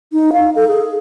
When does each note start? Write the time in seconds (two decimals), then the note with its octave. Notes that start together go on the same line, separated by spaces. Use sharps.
0.13 D#4
0.33 F5
0.56 A4
0.68 G#4